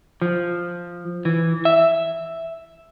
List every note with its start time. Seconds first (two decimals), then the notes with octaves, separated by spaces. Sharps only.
0.22 F3
1.25 E3
1.65 E5